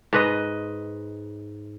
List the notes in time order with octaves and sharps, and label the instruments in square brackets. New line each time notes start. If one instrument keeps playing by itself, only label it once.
[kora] G#2 B4 D#5